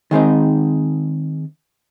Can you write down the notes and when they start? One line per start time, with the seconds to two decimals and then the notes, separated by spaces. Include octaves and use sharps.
0.11 D#3 G#3 C4 D#4